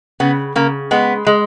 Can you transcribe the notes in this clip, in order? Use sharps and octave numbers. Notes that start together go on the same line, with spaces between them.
C#3 B3
C#3 A#3
G#3 B3
G#3